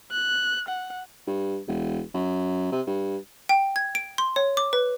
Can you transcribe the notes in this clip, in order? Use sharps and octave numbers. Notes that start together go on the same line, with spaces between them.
F#6
F#5
G2
E1
F#2
C3
G2
G5
G#6
D7
C6
C#5
D6
B4